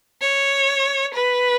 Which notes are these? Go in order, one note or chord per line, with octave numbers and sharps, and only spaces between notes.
C#5
B4